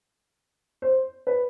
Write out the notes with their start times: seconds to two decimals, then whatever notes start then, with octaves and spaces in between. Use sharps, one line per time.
0.82 C5
1.27 B4